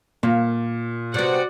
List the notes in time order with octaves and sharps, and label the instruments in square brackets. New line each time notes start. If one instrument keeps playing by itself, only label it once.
[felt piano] A#2 [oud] A#3
[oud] C3 B3 [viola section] F#4 D5 F#5